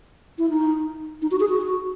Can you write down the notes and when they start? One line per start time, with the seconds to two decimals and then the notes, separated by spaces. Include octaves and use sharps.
0.38 E4
0.50 D#4
1.22 D#4
1.31 F#4
1.40 G#4
1.49 F#4